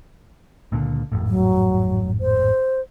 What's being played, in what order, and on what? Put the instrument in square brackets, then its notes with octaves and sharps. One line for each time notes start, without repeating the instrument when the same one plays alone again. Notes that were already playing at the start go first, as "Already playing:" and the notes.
[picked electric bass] C#2 A#2 D3
G#1 F2 A2
[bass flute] F#3
C5